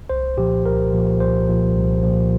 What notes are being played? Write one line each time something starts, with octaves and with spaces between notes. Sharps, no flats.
C2 C5
A#2 F3 G4
C2 A#4
A#2 F3
C2 C5
A#2 F3
C2
A#2 F3